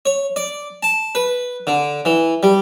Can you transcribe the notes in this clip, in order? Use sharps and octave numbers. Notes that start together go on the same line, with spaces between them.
C#5
D5
A5
B4
D3
E3
G3